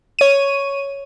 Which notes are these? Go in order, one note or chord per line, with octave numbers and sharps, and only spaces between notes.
C#5 D#7